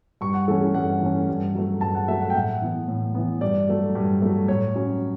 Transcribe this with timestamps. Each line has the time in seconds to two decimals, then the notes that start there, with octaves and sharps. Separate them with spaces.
0.21 G2 C#6
0.34 F#5
0.48 E3 A3 C#4 A4
0.61 A4
0.74 G2 F#5
1.01 E3 A3 C#4
1.29 G2
1.55 F#3 A3
1.81 G2 A5
1.95 F#5
2.08 F#3 A3 E5
2.21 F#5
2.30 G5
2.34 A2 F#5
2.62 E3 B3
2.88 A2
3.15 E3 B3
3.41 G2 D5
3.69 F#3 A3
3.95 G2
4.22 F#3 A3
4.48 A2 C#5
4.75 F#3 C#4